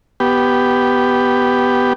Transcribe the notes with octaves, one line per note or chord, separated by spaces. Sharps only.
B3 G4